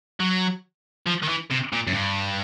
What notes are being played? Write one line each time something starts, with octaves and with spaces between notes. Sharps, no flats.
F#3
F3
D#3
E3
C3
A#2
F#2
G2